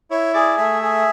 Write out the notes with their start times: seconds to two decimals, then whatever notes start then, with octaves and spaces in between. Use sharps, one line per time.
0.11 E4 C#5
0.34 G#4 D5
0.57 A3 E5
0.82 G#4